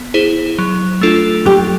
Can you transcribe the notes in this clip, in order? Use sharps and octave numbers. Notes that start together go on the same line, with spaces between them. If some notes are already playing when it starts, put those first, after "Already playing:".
Already playing: B3
E4 G#4 C5
F#3
A3 D4 F4 A4
F#3 G4